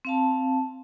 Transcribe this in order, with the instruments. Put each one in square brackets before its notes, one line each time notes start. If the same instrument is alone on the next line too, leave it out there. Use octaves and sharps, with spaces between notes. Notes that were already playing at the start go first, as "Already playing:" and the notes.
[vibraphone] C4 F5 A5